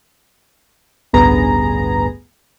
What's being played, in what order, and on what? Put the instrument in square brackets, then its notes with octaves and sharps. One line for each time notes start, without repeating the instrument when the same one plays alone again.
[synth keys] A1 D2 G2 B3 G#4 A#5